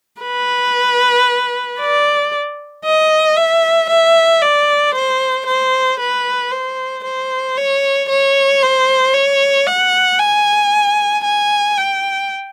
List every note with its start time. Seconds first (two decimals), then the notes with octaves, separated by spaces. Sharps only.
0.22 B4
1.80 D5
2.85 D#5
3.36 E5
3.89 E5
4.41 D5
4.95 C5
5.47 C5
6.00 B4
6.52 C5
7.04 C5
7.58 C#5
8.09 C#5
8.62 C5
9.14 C#5
9.67 F#5
10.19 G#5
11.25 G#5
11.77 G5